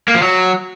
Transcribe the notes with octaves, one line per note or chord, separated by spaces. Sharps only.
A#3
F3
F#3